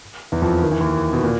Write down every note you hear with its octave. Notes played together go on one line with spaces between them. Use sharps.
E2 E3
F2 F3
D#3
E3
D#2 D#3
B2
A#2